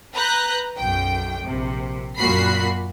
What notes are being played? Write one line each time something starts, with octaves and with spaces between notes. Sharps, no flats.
B4 A#5 F#6 G6
B1 F#2 G5
A#1 C3
F#2 A#2 F#4 B5 C7